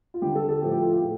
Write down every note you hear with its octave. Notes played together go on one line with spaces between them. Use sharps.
F4
D3 G3 G4
A4
A4
A2 F3 A3 G4
G4
F4
G4
A2 A4